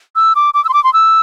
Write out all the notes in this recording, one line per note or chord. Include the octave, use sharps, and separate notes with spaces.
E6
D6
D6
E6
C6
D6
C6
E6